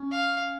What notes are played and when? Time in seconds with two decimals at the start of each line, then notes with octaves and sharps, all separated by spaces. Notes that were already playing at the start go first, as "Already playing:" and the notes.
Already playing: C#4
0.11 F5